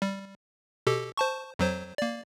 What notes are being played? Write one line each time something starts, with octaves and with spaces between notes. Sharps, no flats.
G3
B2 G4 A4
C5 A5 C#6
F2 F#3 C5
A#3 D5